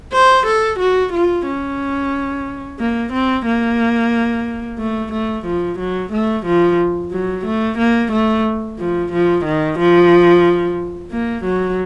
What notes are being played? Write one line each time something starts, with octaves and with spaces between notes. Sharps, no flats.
C5
A4
F#4
F4
C#4
A#3
C4
A#3
A3
A3
F3
F#3
A3
F3
F#3
A3
A#3
A3
F3
F3
D#3
F3
A#3
F#3